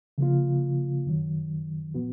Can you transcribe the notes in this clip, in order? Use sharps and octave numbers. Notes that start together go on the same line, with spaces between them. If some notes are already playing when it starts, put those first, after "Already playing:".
C#3 F3 A#3 F4
F#2 D#3 F#3
A#2 F3 B3 F#4